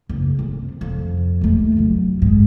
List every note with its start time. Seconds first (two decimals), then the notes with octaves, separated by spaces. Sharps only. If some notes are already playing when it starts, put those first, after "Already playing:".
0.09 F#1
0.39 C3
0.81 F2
1.41 D#2 A3
1.77 F1 F#3
2.22 G#2